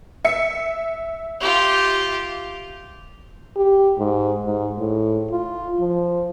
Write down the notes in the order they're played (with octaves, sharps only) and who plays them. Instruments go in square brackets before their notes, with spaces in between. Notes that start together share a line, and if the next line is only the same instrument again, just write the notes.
[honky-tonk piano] E5 C#7
[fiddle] F4 G4
[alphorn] G4
G#2
G#2
A2
F4
F3